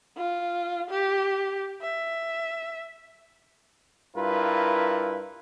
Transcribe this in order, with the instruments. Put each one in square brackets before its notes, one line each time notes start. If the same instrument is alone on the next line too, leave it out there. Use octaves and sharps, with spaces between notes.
[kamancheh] F4
G4
E5
[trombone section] G2 E4 F4 A#4 B4